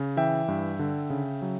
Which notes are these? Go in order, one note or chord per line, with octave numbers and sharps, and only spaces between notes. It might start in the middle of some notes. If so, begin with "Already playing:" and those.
Already playing: C#3
E3 E5 G5
G2
D3
C#3
F#3